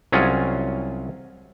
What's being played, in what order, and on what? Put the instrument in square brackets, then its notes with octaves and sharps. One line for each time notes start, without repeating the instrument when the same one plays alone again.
[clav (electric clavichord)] C2 F#3 C#4 F4 G#4